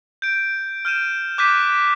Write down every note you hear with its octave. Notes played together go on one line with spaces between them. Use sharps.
G6 D7
F6 G6 D#7 E7
D6 F#6 G6 A6 B6 D#7